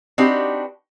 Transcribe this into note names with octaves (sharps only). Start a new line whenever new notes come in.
C4 D4 D#4 F#4 G4 B4